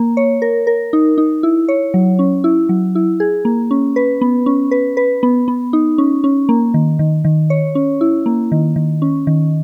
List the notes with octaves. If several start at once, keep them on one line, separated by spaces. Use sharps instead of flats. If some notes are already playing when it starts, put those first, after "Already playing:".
Already playing: A#3
C#5
A#4
A#4
D#4
D#4
E4
C#5
F#3
C#4
E4
F#3
E4
G#4
A#3
C#4
B4
B3
C#4
B4
B4
B3
B3
D#4
C#4
C#4
A#3
D#3
D#3
D#3
C#5
C#4
E4
A#3
D#3
D#3
C#4
D#3